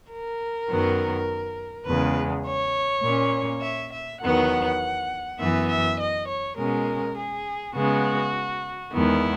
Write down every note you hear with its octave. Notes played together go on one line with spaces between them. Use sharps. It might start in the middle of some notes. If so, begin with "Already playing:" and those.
A#4
F#2 D#3 F#3 B3
E2 C#3 G#3 B4
C#5
A#2 A#3 C#4
E5
E5
E2 D#3 F#3 B3 F#5
F#2 E3 B3 E5
E5
D#5
C#5
B2 G#3 C#4 A#4
G#4
C#3 G#3 B3 F#4
E2 D#3 G#3 B3 E4